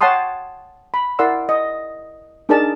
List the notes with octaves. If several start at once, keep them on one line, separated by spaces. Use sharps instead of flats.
C#5 F#5 G5 A5 C6 D#6
B5
E4 A#4 D5 F#5 C6 E6
D#5
D4 D#4 G#4 A#4 D5 A5